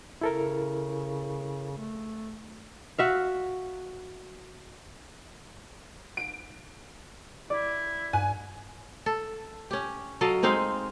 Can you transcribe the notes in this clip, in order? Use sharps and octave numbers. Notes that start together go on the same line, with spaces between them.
C#3 E4 A4 A#4
A3
F#4 E5 F5
D7
E4 D5
G2 G#5 F#6
A4
C#4 G4
F#3 A4 D#5 F5
G#3 C4 D#4 F5